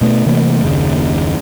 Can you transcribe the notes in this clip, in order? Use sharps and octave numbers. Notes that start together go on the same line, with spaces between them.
B2 A3 B3
C3 E3 A3 A#3
F#1 D#2 C#3